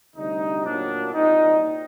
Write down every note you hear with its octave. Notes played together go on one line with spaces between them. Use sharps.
D2 C3 G3 D#4
A#2 F#3 A#3 D4
C2 A#2 G3 C4 D#4